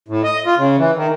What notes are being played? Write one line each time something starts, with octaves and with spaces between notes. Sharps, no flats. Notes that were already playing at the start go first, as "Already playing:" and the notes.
A2
D#5
F4
C#3
E3
D#3